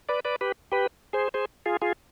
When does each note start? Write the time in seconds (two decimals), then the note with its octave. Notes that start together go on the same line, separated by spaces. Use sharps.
0.09 B4 D5
0.25 B4 D5
0.41 G4 B4
0.72 G4 B4
1.13 G#4 C5
1.34 G#4 C5
1.66 F4 G#4
1.82 F4 G#4